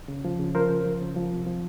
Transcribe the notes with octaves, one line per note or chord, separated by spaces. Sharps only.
C#3
F3
C#3
F3 A#4 C5
C#3
F3
C#3
F3
C3
F3